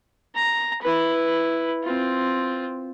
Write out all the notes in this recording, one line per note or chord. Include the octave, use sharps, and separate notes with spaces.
A#5
E4 B4
C4 F4